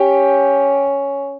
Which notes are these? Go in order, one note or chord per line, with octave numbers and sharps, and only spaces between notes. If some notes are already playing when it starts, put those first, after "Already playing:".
Already playing: C#4 G4 G5